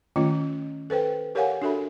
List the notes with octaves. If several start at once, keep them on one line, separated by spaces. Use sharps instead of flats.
D#3 A3 C#4 F4 D#5
A4 B4 C5 G5
G4 A#4 C#5 F5 F#5 G#5
D4 F#4 A4 E5 B5